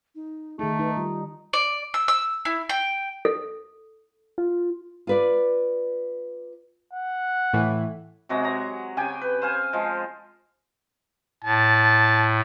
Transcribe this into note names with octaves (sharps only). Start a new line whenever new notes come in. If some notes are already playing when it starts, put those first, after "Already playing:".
D#4
D#3 A3 D#4 G#4
D#4 B4
G3 F4
D5
E6
E6
E4
G5
A4
F4
F4 B4 D5
F#5
A2 E3
C3 F#3 G#3 A#5
C#5 A#5
C#3 G4 G5 G#5
B4
C5 F5 G#5
F3 G#3
A2 A5